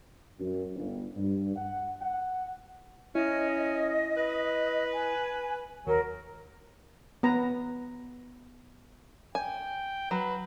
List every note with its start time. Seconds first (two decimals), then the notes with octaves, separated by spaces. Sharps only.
0.40 F#2
0.75 G1
1.16 G2
1.56 F#5
2.01 F#5
3.15 C#4 E4 D#5
4.17 B4
4.93 G#5
5.87 D#2 F#3 A#4
7.23 B3 B4 A#5
9.35 G5 G#5
10.11 F#3 B4